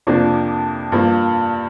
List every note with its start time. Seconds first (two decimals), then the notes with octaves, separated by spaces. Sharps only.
0.07 F2 C3 F3 A#3 D4
0.92 G2 F3 A#3